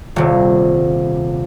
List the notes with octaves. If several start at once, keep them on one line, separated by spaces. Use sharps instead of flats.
D#1 C3